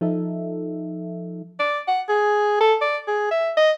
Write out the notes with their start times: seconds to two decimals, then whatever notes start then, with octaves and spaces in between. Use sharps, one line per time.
0.01 F3 D#4 A4 E5
1.60 D5
1.88 F#5
2.09 G#4
2.60 A4
2.81 D5
3.08 G#4
3.31 E5
3.57 D#5